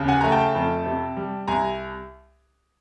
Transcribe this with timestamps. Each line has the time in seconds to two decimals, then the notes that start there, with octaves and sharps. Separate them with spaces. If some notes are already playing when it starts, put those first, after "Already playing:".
Already playing: D#2 C#3
0.08 F#5 G#5
0.21 A3 A#5
0.32 G5 A5
0.55 F2
0.86 C3
1.17 G3
1.48 C2 G#5 A#5